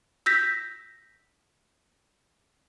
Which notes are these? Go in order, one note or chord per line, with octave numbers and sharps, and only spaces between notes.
E6 G6 A#6 B6